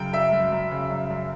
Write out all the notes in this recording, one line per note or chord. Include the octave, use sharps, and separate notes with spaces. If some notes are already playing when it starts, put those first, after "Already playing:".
Already playing: F#2 C#3 G5
F#2 E5
F#2
F#2
C#3
F#2
F#2